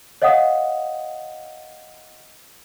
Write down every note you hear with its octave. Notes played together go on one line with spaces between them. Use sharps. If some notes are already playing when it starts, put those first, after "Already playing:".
C#5 D#5 F5 F#5 D#6